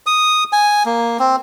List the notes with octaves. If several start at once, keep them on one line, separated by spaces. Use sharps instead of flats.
D#6
G#5
A#3
C4